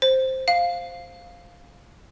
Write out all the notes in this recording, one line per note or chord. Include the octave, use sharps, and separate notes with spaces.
C5
F5